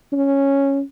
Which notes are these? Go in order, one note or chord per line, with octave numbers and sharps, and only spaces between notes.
C#4